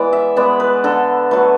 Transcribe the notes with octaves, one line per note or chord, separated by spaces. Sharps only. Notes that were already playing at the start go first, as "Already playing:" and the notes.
Already playing: E3 G#3 B3 D5
E5
G#3 B3 D5
B4
D3 A4
F#3 A3 B4